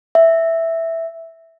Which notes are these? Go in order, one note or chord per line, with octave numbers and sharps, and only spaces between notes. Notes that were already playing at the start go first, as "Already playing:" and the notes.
E5